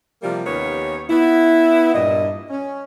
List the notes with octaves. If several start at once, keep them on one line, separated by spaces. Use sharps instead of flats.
C3 F3 G3 A#3 F4
D#2 A#3 B3 C#4 G4 C#5
B3 E4
G2 A#2 D#5
C#4